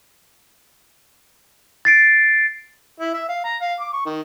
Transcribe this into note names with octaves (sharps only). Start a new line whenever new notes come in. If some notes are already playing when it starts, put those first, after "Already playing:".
A6 C7 D7
E4
E5
F5
A#5
F5
D6
C#6
D#3